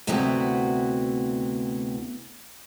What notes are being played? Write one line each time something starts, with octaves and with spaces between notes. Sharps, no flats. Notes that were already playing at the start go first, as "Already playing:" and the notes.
D2 C3 B3 E4 F#4 G5